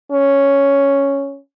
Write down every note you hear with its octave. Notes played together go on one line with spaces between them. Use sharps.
C#4